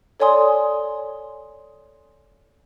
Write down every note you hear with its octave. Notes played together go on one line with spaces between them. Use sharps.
A4 C#5 D5 G#5 C6 D#6